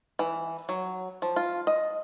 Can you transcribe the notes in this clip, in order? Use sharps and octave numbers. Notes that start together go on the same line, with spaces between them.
E3
F#3
F3
F4
D#5